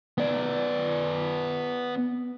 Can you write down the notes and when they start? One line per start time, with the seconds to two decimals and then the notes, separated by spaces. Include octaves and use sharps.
0.18 B3 D5